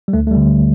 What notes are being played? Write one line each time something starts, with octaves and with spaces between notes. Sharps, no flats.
G3
D2 A3
A3
G3
D3